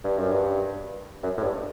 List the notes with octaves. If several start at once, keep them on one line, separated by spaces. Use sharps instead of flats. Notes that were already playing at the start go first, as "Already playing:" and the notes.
G2
F#2
G2
F#2
A2
G2